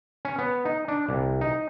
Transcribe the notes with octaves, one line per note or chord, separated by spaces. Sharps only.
C#4
B3
D#4
D4
C2
D#4